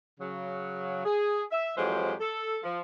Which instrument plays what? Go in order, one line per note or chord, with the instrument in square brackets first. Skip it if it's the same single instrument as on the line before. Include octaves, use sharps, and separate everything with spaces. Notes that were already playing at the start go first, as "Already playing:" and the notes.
[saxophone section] C#3 F#3
G#4
E5
F2 E3 F#3 G#3 G4 C5
A4
F3